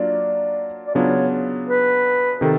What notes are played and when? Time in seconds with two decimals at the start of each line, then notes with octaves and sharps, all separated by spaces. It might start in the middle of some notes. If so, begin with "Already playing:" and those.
Already playing: F#3 A#3 D4 F4 D5
0.87 D5
0.95 C#3 F#3 B3 D4 F4 C#5
1.68 B4
2.40 C3 D#3 A4